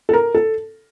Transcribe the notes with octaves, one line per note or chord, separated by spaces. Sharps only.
A4
A#4
A4